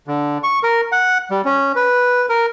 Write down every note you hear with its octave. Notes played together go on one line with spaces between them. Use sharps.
D3
C#6
A#4
F#5
G3
C#4
B4
A#4